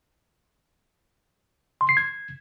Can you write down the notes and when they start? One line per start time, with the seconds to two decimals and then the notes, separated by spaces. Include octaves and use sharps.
1.81 C6
1.89 C7
1.97 G#6